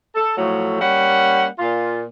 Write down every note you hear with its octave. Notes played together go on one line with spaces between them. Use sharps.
A4
A2 F3 F#3 A3
G3 A#3 C#4 F#5
A#2 F4